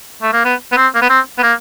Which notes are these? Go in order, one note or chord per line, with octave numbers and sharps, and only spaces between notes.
A3
A#3
B3
B3
C4
A#3
B3
C4
B3
A#3